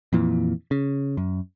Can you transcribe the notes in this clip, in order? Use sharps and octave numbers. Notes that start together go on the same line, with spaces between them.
F2 A#2 E3
C#3
F#2